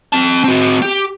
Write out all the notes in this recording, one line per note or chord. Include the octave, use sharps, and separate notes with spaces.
C4 A5
C4 F#4
G4